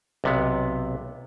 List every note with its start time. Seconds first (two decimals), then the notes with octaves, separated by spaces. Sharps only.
0.24 B1 C3 B3